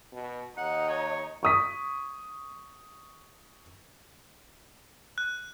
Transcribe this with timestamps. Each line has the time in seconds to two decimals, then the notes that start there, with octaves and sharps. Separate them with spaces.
0.12 B2
0.57 D#2 D#4 F#5
0.89 C#5
1.43 C#6 D#6 B6
5.18 F#6